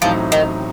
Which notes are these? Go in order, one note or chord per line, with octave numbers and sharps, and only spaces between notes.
A1 A2 F3 F#3 C4 D#4
D#3